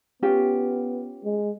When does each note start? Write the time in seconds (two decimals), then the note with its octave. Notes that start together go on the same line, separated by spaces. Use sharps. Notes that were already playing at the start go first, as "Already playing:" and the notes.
0.23 B3 C#4 F4 G4
1.25 G#3